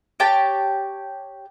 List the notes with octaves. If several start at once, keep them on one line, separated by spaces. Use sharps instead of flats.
G4 C#5 G5 A5